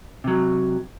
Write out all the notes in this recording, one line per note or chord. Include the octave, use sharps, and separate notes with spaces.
C3 F#3